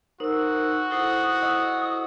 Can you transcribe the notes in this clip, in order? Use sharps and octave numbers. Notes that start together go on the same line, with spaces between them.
D#4 F#4 A#4 C5 E6
E4 A4 C5 F#5 D#6
D#5 F#5 D#6 E6